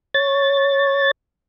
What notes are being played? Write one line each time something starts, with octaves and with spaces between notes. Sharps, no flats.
C#5 A6